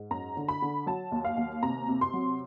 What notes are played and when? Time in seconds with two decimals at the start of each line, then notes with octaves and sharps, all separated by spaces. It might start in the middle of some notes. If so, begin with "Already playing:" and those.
Already playing: G#2
0.11 F#2 A#5
0.37 D3
0.48 B5
0.62 D3
0.86 F#3 A5
1.12 D#2
1.25 F5
1.37 D#2
1.63 C3 A#5
1.89 C3
2.01 C6
2.13 F#3